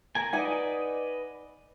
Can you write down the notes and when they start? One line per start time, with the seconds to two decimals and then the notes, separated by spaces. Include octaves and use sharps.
0.15 A#4 G#5
0.33 D#4 B4 D5 D#5 F#5 G#5